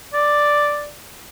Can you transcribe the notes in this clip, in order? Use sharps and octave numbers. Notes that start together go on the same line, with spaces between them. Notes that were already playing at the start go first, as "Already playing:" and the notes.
D5